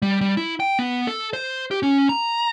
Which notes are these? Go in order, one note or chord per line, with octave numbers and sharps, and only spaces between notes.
G3
G3
E4
G5
B3
A4
C5
G4
C#4
A#5